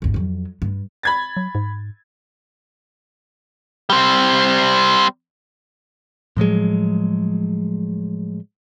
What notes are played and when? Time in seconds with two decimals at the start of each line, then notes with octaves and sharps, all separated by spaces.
0.02 G#1 D#2
0.14 F2 F#3
0.62 G2
1.03 B5 G#6 A6
1.37 F#3
1.55 G#2
3.90 G3 C4
6.37 A2 F3 F#3 G#3